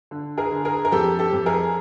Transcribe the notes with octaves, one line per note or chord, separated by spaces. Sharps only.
D3
G#4 A#4
D3
G#4 A#4
A#4
F2 G4 A4
G4 A4
F2
G#4 A#4